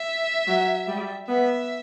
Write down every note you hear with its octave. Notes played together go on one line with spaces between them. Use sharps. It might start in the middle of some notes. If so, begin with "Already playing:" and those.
Already playing: E5
F#3
G3
B3 E5